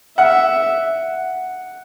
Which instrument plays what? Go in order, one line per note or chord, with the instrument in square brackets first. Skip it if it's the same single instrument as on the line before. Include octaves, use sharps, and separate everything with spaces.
[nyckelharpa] E5 [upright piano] F#5